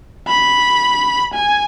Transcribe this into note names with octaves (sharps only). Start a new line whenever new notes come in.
B5
G#5